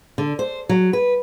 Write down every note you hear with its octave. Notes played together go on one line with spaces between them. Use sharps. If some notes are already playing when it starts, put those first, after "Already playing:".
D3
C5
F#3
B4